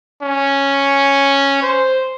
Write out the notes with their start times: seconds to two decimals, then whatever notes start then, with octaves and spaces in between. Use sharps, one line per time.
0.22 C#4
1.62 C5